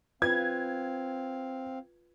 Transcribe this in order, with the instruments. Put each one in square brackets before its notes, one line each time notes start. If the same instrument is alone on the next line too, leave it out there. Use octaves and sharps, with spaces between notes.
[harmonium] C4 F5 [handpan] F4 B4 [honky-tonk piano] G#6